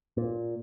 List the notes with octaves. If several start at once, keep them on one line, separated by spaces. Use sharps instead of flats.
A#2